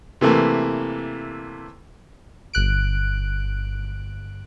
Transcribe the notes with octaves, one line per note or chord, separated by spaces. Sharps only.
C3 E3 A3 A#3
G1 F#6 D7